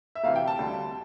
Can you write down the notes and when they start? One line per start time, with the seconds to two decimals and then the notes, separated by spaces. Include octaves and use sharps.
0.15 E5
0.24 D2 C3 E3 F5
0.36 G5
0.47 A5
0.59 D2 D3 G3